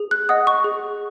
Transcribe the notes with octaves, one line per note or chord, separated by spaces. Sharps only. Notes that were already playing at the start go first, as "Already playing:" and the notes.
Already playing: G#4
F#6
D#5 F#5 D#6
C#6
G#4